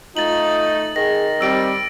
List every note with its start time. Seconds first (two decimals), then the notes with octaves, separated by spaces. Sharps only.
0.17 A3 D#4 F4 A6 F#7
0.96 D#3 G#4 A#6
1.41 G3 C4 E6 D7